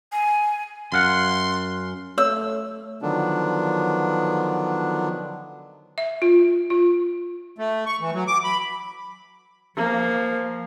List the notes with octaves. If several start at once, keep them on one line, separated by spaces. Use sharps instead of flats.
G#5
F#2 F5 F#5 C6
A3 C#5 E6
D3 D#3 F3 F#3 B3 D4
E5
F4
F4
A3
C#6
E3
F#3
D6
B5
F3 A#3